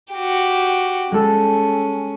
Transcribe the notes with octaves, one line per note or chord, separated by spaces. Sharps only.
F#4 G4
G#3 C#4 A4